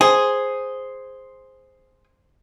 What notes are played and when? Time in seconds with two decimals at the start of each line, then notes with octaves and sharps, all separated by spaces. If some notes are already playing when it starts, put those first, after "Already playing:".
0.01 G#4 C5